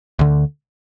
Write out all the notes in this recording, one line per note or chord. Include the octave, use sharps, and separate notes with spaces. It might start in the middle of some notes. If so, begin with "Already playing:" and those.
D2 D3